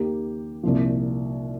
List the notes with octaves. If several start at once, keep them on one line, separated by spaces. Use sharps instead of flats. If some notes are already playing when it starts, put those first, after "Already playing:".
Already playing: D#2 D#3 A#3 G4
C2 A#2 F3